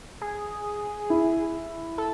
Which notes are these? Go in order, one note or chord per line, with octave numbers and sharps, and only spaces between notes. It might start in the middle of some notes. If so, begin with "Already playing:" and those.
G#4
E4
A4